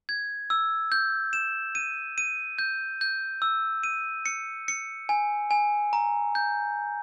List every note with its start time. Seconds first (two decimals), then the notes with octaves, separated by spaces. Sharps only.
0.09 G#6
0.50 E6
0.92 G6
1.33 E7
1.75 D#7
2.18 D#7
2.58 G6
3.01 G6
3.42 E6
3.83 D#7
4.26 C#7
4.68 C#7
5.09 G#5
5.51 G#5
5.93 A#5
6.35 G6